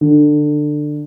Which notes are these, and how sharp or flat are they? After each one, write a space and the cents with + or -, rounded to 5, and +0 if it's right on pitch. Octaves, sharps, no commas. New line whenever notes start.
D3 +20